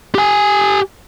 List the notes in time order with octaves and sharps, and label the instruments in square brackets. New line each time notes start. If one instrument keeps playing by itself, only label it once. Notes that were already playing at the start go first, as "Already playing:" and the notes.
[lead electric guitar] G4 G#5